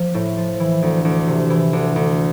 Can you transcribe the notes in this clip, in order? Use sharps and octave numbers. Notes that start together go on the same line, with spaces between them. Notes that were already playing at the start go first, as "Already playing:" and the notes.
Already playing: F3 A#3
A2
F3
E3
D2
D2
C3
E3
D2
D2